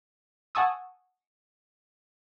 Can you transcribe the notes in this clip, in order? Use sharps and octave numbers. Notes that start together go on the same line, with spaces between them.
F#5 G#5 A5 C#6 D#6 E6